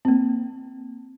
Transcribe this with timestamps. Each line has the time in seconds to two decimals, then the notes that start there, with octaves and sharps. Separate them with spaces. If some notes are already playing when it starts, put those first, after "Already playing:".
0.05 A#3 C4